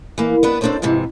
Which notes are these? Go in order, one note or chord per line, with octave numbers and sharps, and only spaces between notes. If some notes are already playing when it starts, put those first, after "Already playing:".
E3 A#3
B3 D4 B4
D#2 C4 D4 A4 C5 C#5
F2 G#2 C3 E3